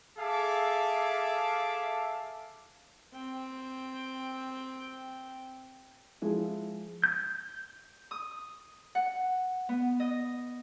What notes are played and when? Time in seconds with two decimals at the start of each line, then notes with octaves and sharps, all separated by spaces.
0.18 G#4 A4 E5 F5 A5 D6
3.14 C4 G5
6.22 F3 G#3 E4
7.04 G6
8.11 D#6
8.95 F#5
9.69 B3
10.00 D#5